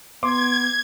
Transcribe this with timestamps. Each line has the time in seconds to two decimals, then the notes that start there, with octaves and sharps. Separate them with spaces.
0.23 B3 C6 D6 G#6